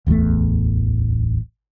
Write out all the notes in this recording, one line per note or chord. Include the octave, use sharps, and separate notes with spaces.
D1 A1 E2 A3